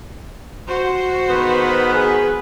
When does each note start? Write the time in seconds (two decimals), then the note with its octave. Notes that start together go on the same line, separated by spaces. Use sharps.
0.68 F#4 C5
1.30 D#3 G#3 B3 B4
1.94 G#4 B4